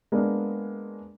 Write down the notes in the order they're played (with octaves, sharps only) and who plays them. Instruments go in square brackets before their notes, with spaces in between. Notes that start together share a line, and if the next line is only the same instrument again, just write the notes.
[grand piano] G#3 A#3 B3 D4